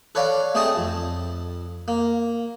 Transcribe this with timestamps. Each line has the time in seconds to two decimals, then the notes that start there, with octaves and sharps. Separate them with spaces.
0.15 A4 B4 C#5 D5 F5
0.55 A3 C4 G#4 D#5 A5
0.76 F2
1.88 A#3